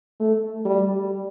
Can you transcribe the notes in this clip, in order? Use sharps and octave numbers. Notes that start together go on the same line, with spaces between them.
A3
G3